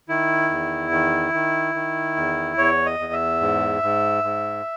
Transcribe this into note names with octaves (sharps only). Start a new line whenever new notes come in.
D#3 E4
E2
D#3
D#3
D#3
E2
E2 C#5
D#5
E2
E5
G#2
G#2
G#2